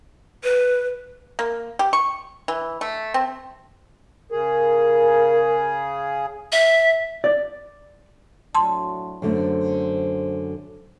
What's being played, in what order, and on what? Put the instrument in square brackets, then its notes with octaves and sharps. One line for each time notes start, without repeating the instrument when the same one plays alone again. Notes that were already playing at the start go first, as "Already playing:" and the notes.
[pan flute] B4
[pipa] A#3
G4
C#6
E3
A3
C4
[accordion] C#3 G#4 [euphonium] A#4
[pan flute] E5
[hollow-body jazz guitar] D5
[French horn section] A2 F#3 D4 [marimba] A5 C6
[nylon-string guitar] F#2 D3 A3 [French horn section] C5